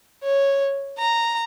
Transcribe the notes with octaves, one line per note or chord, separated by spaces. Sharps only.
C#5
A#5